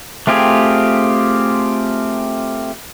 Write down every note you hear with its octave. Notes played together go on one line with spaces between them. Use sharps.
A3 C4 F4 G4 G#4